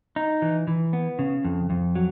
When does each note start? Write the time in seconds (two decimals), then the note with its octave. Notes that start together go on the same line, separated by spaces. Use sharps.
0.16 D#4
0.42 E3
0.67 E3
0.93 B3
1.19 C#3
1.45 F2
1.70 F2
1.95 F#3